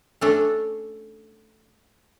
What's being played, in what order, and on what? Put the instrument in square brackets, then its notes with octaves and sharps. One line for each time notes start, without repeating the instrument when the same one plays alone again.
[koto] A3 C#4 D4 A4